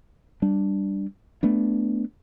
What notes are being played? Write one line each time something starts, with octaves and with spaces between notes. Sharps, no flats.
G3 D4
A3 B3 D4